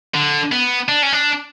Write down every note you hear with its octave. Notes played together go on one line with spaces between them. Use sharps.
D3
B3
D4
C#4
D4